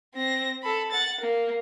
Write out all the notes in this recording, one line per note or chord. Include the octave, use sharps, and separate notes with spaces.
C4 A#6
A4 B5
F#5 A6
A#3